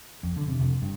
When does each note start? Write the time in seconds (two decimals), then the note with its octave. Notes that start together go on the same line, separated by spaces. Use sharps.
0.23 F2
0.36 D3
0.48 C3
0.61 F1
0.82 G2